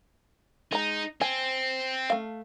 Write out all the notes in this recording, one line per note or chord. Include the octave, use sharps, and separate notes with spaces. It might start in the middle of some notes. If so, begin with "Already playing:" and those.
G#3 D#4 A#5
C4 G#5
A3 F5